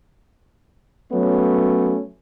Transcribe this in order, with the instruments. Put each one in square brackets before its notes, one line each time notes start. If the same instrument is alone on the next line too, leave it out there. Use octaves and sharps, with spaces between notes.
[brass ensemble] F#3 A3 B3 C#4